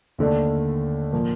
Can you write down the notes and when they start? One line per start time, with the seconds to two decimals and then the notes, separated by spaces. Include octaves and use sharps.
0.18 D#2 D3 A3 D4
1.13 A#2 F3 A#3